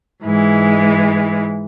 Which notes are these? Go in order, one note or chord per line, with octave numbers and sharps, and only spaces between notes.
G#2 E3 G#3